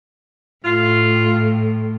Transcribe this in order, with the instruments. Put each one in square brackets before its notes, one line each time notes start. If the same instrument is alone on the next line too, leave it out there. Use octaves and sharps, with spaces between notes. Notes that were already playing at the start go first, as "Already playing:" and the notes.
[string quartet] A2 [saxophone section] F4